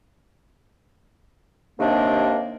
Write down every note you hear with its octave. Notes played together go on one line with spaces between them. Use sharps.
D#2 C3 D#3 A#3 D4